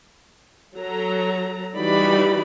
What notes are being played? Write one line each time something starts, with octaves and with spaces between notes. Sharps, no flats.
F#3 A4 A#5
E3 G3 D#4 F#4 D5 B5